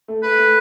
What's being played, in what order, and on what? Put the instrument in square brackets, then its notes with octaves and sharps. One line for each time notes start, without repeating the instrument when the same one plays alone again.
[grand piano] A3
[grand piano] A3 [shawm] B4
[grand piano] A3